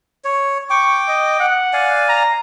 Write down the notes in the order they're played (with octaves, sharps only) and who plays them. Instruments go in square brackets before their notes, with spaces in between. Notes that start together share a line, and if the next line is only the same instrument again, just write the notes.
[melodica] C#5
[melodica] G5 D6 [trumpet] C#6
[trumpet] D#5
F#5
[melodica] D5 F5 G#5
[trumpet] A#5